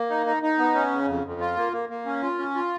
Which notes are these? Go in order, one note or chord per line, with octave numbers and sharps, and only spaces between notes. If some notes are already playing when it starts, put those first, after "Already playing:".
Already playing: A#3
D#4
D#4
D#4
B3
C#4
C#3
F2
F2
F4
A#3
A#3
A#3
C#4
F4
C#4
F4